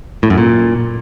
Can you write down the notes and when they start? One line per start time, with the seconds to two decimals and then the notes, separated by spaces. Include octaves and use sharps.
0.23 A2
0.30 F#2
0.38 A#2